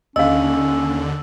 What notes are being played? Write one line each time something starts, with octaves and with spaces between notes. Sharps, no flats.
D#2 D3 C#4 D#5 F5 E6